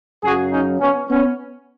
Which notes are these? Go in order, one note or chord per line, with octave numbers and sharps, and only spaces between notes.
F#2 C#3 F#3 F#4 G#4
C#4 D#4
B3 C#4
B3 C#4